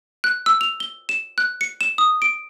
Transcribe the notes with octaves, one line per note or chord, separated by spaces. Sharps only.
F#6
E6
F7
G7
E7
F#6
C#7
E7
D#6
D7